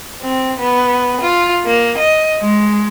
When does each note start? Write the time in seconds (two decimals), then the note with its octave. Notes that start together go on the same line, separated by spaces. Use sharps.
0.21 C4
0.60 B3
1.20 F4
1.66 A#3
1.98 D#5
2.40 G#3